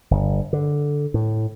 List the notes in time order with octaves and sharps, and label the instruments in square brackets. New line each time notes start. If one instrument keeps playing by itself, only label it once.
[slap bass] G1
D3
A2